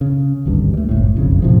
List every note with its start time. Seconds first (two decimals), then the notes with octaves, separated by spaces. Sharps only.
0.01 C#3
0.45 G#1 D2 G2
0.74 G3 A3
0.89 F#1 C#2 A2
1.16 F#1 B1 F2 C#3
1.42 G#1 A2 C3 F3